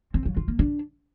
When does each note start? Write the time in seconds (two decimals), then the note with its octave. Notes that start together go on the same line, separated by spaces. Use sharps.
0.14 C4
0.25 F#3
0.37 F4
0.48 A#3
0.59 D4